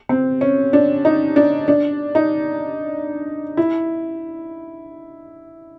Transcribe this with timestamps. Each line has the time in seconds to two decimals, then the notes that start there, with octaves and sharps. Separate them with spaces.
0.09 C4
0.41 C#4
0.73 D4
1.05 D#4
1.36 D4
1.68 D4
2.15 D#4
3.57 E4